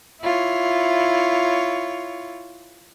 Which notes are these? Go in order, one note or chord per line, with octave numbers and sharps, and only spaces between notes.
E4 F4 C#5